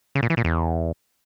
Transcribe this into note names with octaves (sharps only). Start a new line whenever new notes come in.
C#3
A#2
E3
A#2
E2